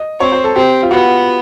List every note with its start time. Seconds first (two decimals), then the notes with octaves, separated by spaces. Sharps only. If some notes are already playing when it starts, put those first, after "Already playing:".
Already playing: D#5
0.20 C4 C#5
0.32 C5
0.44 A4
0.56 C4 G4
0.83 F4
0.91 B3 F#4